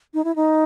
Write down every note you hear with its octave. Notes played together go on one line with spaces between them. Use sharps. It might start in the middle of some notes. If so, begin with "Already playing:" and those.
D#4
E4
D#4